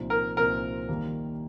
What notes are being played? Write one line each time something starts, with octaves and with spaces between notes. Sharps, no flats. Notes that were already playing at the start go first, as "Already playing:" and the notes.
Already playing: C2 A#2 F3 C4 D#4
A#4
C2 A#2 F3 C4 D#4 A#4
D#2 D#3 G3 A#3